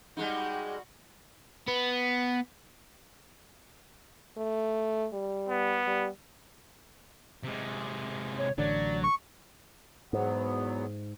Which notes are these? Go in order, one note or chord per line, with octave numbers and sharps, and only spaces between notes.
G3 G#3 D#4 F#4
B3
A3
G3
B3
G3
C3 G#3
C#5
A1 D3 F#3 D5
C#6
E2 G#2 F#3 B3